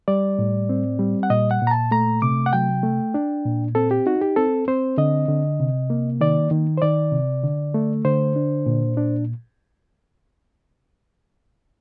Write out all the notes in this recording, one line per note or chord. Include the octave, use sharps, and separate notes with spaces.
G3 D5
A2
C4
G3
F#5
A#2 D#5
F#5
A#2
A#5
A5
A3 A#5
C3 D6
F#5
F#3 G5
A3
D4
A#2
C4 A4
G4
D#4 F#4
G4
C4 A4
C4 C5
D3 D#5
D3
C3
A#3
D#3 D5
D#3
C5
D#3 D5
C3
D3
A3
D3 C5
D4
A#2
D4